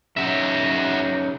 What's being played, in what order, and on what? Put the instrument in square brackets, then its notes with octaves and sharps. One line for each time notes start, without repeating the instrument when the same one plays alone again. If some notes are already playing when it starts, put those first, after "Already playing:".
[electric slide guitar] C#3 F#3 D#4 [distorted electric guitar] F#4 E5